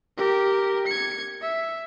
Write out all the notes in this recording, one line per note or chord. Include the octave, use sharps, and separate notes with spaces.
G4 A#4
G#6 C#7
E5